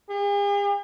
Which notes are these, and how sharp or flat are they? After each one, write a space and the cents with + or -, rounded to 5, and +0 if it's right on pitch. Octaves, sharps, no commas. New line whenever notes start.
G#4 -45